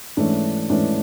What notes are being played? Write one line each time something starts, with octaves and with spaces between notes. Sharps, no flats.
G#2 E3 A3 C#4 D4
G#2 E3 A3 C#4 D4